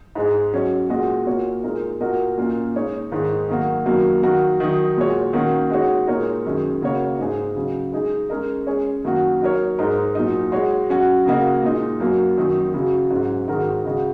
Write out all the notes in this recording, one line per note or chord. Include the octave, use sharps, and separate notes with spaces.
G#2 G#3 D#4 G#4
F#3 C#4 G#4 C#5
A#2 G#3 F#4 D#5
A#2 A#3 F#4 C#5
A#2 G#3 D#4 A#4
A#2 A#3 F#4 A#4 D#5
A#2 A#3 C#4
G#3 D#4 G#4 C#5
G#2 D#3 G#3 D#4
D#3 F#3 A#3 F#4
F#2 D#3 F#3 A#3
D#3 F#3 A#3 F#4 A#4
D#3 F#3 D#4
A#2 G#3 F#4 C#5
D#3 A#3 C#4 F#4
G#3 D#4 F#4 C#5
A#2 G#3 D#4 A#4 C#5
F#2 D#3 G#3 C#4
C#3 A#3 F#4 C#5
G#2 G#3 D#4 G#4
C#3 F#3 C#4
G#3 D#4 G#4 D#5
G#3 C#4 A#4 D#5
G#3 C#4 G#4 C#5
F#2 D#3 A#3 F#4
F#3 D#4 A#4 C#5
G#2 G#3 D#4 A#4
A#2 F#3 D#4
G#3 F#4 C#5
F#3 C#4 F#4
C#3 A#3 F#4 D#5
A#2 G#3 D#4
F#2 F#3 A#3
F#2 D#3 F#3 D#4
F#2 C#3 F#3
G#2 F#3 C#4
G#2 D#3 G#3 F#4 A#4
C#3 G#3 F#4 D#5